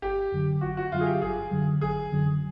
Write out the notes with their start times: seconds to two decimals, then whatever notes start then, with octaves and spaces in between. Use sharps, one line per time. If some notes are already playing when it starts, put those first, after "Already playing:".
0.02 G1 G4
0.32 F#2 D3 F#3
0.61 G1 F#4
0.77 F#4
0.92 F#2 D3 F#3 F4
1.00 G#4
1.06 G4
1.22 G1 G#4
1.51 F#2 D3 F#3
1.81 G1 G#4
2.12 F#2 D3 F#3